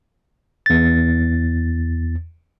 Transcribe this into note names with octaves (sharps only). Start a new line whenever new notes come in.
E2 A6